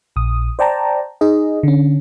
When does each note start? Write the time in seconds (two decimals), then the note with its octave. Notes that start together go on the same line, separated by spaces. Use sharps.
0.16 A#1 D#6
0.59 C5 D5 G5 A5 A#5
1.21 D#4 G#4 D#5
1.63 D3 C#4